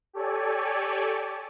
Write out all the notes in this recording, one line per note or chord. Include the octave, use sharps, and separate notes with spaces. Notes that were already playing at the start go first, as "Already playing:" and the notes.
G4 A4 C#5 D5 G#5